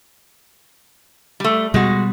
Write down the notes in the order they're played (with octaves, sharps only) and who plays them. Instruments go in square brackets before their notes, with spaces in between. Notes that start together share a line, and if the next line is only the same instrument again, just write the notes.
[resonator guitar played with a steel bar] G3 A3
[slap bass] B2 G3 [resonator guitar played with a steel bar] G#3 F#4